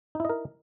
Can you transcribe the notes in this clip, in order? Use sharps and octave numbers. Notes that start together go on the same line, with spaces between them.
D#4 E4 A#4 D#5